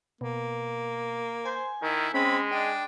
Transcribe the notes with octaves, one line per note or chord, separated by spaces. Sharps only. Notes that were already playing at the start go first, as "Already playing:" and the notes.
B2 A#3
C5 G#5
D#3 E4
G#3 C4 C#4 B5
D4 D#5 G5